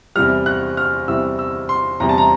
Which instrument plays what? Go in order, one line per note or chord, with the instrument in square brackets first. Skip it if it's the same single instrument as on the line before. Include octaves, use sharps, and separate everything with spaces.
[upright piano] E2 C3 E3 G3 F6
F#6
F6
E2 C3 E3 G3 E6
E6
C6
E2 C3 E3 G3 A#5
A5
A#5